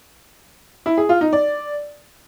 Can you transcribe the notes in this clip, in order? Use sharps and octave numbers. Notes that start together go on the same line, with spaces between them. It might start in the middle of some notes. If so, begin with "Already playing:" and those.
E4
G#4
F4
D#4
D5